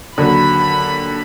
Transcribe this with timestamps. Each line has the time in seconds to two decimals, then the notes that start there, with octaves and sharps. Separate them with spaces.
0.18 D#2 D3 F#3 B5